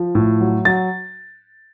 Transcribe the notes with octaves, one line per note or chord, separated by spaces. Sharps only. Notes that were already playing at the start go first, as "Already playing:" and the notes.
Already playing: F3
A2
F#3
F#3 A6